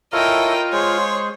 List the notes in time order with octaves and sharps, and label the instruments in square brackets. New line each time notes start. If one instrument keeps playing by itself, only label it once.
[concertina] E4 A4 C#5 [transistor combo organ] F4 [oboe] A#4 [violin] D#5 G5
[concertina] G#3 G#4 [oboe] C5 [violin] C#5